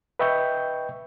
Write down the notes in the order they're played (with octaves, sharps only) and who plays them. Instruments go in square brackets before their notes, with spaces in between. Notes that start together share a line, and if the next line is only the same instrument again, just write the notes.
[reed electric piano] B4 D#5 E5 G5 C#6 G6